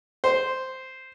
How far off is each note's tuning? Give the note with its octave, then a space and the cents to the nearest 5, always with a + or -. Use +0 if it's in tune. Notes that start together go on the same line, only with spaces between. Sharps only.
C5 -5